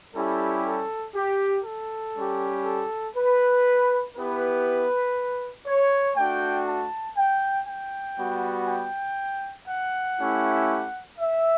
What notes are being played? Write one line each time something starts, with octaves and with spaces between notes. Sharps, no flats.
G3 C#4 E4 G4 A4
A4
G4
A4
G3 C#4 G4
A4
B4
B3 E4 G4 B4
C#5
A3 D4 F#4 G5
A5
G5
G5
G3 B3 F#4
G5
F#5
A3 C#4 E4 G4
E5